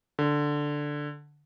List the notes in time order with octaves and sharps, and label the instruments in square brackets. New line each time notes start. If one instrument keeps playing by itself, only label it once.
[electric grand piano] D3